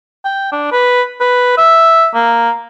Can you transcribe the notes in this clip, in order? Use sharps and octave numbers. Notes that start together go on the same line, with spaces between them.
G5
D4
B4
B4
E5
A#3